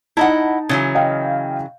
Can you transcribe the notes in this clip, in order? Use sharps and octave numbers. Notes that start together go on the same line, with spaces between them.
D#4 E4 D#5 F#5 A5
C#3 E3 F#3
D#5 F5 G5